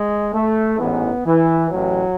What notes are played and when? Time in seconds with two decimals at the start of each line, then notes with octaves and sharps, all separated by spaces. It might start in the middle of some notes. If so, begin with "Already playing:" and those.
Already playing: G#3
0.33 A3
0.79 A1 G#2 E3 B3
1.25 E3
1.71 A1 A2 E3 F#3